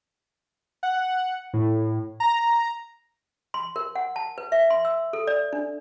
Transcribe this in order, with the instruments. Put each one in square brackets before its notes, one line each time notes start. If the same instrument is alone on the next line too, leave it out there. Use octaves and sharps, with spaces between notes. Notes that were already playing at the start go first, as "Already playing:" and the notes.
[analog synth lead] F#5
A2
A#5
[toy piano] C6
A#4
F#5
A5
B4
E5
C6
E6
A4
D5
D4